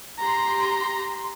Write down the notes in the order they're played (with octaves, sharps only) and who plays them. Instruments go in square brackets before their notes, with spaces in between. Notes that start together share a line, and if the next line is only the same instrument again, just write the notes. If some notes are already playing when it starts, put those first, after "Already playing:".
[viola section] G4 C6 [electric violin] A#5